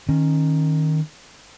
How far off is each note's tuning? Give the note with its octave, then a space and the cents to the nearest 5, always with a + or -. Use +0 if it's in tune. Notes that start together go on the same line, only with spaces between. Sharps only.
D#3 +0 C#4 -20